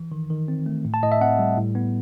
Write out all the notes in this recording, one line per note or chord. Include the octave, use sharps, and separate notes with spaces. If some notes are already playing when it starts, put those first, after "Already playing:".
Already playing: E3
D#3
D#3
C4
A3
A2
A5
A2 D#5
E5
C4 F#5
G3
A2
B3